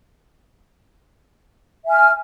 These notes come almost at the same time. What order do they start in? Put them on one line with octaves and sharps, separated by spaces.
E5 G#5 F6